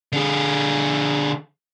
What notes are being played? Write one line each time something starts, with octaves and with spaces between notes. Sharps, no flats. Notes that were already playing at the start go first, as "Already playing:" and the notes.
D3 G#4